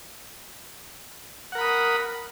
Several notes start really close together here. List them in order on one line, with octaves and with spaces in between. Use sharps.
F#5 A#4 B5 D#6